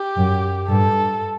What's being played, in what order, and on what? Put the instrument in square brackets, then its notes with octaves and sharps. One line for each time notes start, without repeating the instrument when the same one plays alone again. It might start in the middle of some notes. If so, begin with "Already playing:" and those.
Already playing: [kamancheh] G4
[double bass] F#2
[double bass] G2 [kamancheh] A4